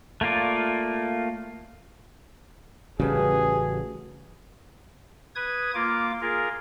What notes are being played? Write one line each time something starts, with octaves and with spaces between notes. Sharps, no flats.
A3 A#3 F4 D5
A1 C#3 G3 F#4 G#4 B4 A5
B4 D#6 G#6
A#3 F4 D6
F4 G#4 A#4